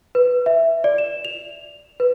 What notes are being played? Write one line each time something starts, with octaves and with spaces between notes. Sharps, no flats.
B4
E5
D5
E7
F7
B4